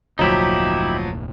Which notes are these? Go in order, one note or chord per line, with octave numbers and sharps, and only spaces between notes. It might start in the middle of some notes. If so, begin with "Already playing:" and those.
F1 D2 A#2 F3 F#3 D#4 E4 G4